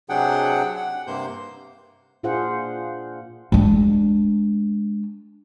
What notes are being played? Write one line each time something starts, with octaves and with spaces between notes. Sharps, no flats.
C3 F#3 D4 G#4 F#5 G5
F#5
G2 C3 A#3 C5 G6
A#2 D4 F4 G#4 C5 F#5
G#3 D4